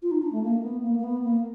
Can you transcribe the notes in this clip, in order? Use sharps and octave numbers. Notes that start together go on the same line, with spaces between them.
F4
D#4
D4
A3
A#3
B3
A#3
A#3
B3
A#3